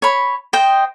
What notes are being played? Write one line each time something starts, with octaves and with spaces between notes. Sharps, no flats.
C#5 B5
C5 D#5 G5